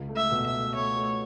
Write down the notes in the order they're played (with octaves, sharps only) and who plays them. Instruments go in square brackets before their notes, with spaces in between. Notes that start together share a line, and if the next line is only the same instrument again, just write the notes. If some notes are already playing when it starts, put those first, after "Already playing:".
Already playing: [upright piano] C#2
A3
[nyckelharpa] E5
[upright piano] B2
[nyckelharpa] E5
[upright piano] A3
[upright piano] A3 [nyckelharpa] C#5
[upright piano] A3